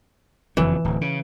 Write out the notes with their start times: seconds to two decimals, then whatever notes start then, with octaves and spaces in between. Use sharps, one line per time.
0.57 F#1 F2 E3 F#3
0.85 D1
1.01 C#3